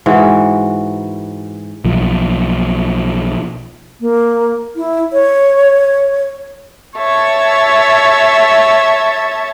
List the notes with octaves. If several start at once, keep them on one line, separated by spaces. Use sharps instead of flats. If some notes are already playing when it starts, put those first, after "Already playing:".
G#2 E3 F#4 A#4
B1 F3
A#3
E4
C#5
C#5 E5 A5